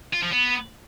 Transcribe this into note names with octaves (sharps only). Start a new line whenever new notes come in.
F4
F3
B3